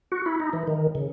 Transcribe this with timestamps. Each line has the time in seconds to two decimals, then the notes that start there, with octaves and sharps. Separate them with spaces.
0.12 F#4
0.26 E4
0.40 D#4
0.53 E3
0.67 D#3
0.95 C#3